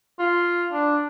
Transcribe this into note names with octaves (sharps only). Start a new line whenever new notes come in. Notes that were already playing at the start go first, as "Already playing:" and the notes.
F4
D4